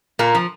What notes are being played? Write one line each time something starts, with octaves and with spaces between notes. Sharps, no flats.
A#2 A#3
F3